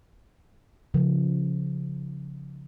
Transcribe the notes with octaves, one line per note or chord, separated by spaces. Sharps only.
C#3 F3